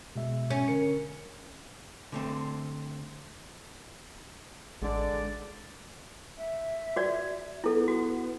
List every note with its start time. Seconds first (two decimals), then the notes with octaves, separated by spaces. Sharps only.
0.15 B2 G#3 E5
0.50 C#4
0.68 D3 A#4 C#7
2.12 D3 A3 C4
4.82 A1 D3 G#3 D5
6.38 E5
6.96 F#4 D5
7.64 B3 E4 A4
7.88 F#4